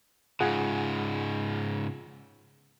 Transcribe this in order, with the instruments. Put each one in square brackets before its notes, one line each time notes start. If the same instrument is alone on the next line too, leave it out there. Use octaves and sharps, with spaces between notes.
[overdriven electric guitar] G#2 C#3 [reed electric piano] F4 G#4 F#5